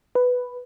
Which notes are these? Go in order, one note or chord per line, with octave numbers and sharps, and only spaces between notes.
B4